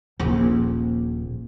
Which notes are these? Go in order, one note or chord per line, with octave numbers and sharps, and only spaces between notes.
D#1 A#1